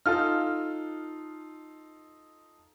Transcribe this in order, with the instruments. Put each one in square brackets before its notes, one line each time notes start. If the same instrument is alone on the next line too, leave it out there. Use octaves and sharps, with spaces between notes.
[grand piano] D#4 F4 A4 [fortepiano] F6